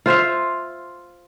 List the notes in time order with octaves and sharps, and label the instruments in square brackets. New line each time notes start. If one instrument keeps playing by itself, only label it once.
[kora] F4 C5 E5 F5